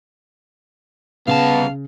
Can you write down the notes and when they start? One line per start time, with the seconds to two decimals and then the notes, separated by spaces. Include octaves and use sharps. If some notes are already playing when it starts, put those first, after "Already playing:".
1.27 C2 C#3 B3 F5 A5